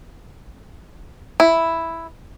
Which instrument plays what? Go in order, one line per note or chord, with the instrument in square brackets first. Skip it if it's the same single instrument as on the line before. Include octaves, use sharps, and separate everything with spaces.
[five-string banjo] E4